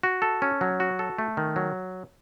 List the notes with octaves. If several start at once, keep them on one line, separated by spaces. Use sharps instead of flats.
F#4
A4
C#4
F#3
F#4
A4
A3
D#3
F#3